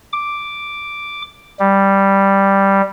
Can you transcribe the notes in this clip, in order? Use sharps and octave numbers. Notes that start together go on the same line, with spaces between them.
D6
G3